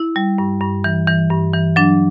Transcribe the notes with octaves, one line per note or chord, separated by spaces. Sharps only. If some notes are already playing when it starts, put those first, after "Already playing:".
Already playing: E4
G3
G2
G2
E3
E3
G2
E3
F#3 D4